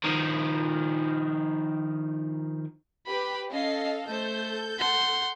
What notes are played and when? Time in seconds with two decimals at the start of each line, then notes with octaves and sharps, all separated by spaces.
0.04 D#3 F3
3.06 G4 B4 B5
3.51 C#4 A4 D#5 F5 C7
4.07 A3 A4 C5 G6
4.78 F#5 C6